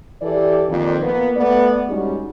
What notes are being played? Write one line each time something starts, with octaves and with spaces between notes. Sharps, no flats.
E3 G4 A4 D5
F2 A#2 D#3
A#3 B3
A3 B3 D5
G3 G#3 C#4 D#4 F#4 G#4